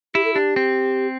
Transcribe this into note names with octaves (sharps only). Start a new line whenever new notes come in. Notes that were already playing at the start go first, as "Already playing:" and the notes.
E4 G4
A4
D4 G4
C4